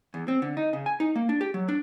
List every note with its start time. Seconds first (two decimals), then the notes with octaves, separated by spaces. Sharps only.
0.14 E2
0.28 C4
0.42 D3
0.57 D#4
0.73 C#3
0.86 G#5
1.00 D#4
1.16 A#3
1.29 D4
1.41 G4
1.54 F#3
1.69 D4